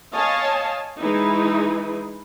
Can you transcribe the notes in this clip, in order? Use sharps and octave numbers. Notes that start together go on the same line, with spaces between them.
C#5 D#5 F5 G#5 A5
E3 G#3 D#4 E4